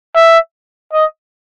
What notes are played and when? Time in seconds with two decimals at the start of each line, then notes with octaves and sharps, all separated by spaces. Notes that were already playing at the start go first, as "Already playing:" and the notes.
0.15 E5
0.93 D#5